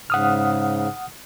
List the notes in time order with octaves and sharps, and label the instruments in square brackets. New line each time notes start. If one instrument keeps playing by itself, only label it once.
[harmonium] G#2 C#3 [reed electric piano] F#5 D#6 F6